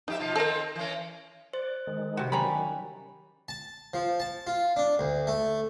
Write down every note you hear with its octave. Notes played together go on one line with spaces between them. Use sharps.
F2 D#4 G4 E5
B2 F3 F4
D#3 C4 D#4 A4 A#4
E3 C#4
C5 D5
D#3 G#3
C3 G3 F#4
D#3 F#3 G3 C#4 A#5 B5
A5
F3
A5
F4
D4
D2
A3